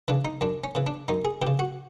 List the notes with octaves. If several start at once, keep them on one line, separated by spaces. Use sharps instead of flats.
C#3 E3 D4
D#4
F#2 D4
C#4
C#3 E3
D4
F#2 D#4
G#4
E3 G4
C#3
F#4